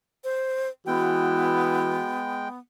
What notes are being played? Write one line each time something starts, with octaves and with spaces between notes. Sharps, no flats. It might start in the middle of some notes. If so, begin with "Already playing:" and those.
C5
E3 G#3 B3 F#4 G5